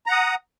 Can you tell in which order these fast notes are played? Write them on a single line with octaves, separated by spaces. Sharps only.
A#5 F#5 D#6